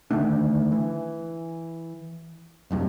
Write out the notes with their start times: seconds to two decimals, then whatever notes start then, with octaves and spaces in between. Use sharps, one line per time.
0.11 D3 D#3 A3 D4
0.72 E3
2.71 F1 B1 G2